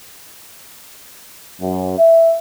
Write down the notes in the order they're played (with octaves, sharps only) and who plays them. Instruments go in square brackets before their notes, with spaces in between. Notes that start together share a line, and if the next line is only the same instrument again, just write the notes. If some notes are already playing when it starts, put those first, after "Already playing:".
[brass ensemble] F#2
E5